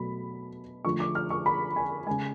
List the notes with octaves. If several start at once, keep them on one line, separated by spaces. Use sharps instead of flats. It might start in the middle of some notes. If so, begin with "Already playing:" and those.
Already playing: B2 F#3 A3 B5
D3 F3 A3 C#6
D6
F6
C#6
B5
G#5
C#3 G#3 G#5